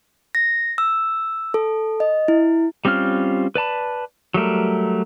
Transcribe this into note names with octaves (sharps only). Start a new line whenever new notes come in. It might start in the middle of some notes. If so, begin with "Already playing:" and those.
A#6
E6
A4
D#5
E4
G3 C4 C#4 F4 F6
B4 D5 A5 B5
F#3 G3 A3 A#4